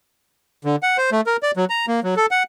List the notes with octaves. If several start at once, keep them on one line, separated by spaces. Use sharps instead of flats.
D3
F#5
C5
A3
A#4
D5
F#3
A#5
A#3
F#3
A4
F#5